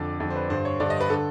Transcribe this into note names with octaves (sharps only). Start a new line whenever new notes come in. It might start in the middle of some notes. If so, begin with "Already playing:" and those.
Already playing: F2 D3 D5
F2 D3
C5
B4
G2 D3 C5
C#5
G2 D3 D5
D#5
B4
D3 A4